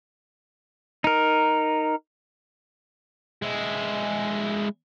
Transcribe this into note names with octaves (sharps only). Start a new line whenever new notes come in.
D#4 A#4
G#3 E4